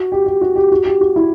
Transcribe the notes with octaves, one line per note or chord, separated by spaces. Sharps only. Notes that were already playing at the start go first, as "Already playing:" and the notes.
Already playing: F#4
G4
G4
F#4
G4
F#4
G4
F#4
E4